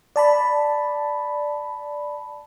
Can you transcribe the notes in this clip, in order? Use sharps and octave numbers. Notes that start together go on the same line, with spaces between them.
D5 A5 B5